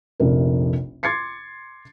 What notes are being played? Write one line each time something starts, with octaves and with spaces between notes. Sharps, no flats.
F1 A#1 C3 A#4
C6 D6 G#6 A6 C7 C#7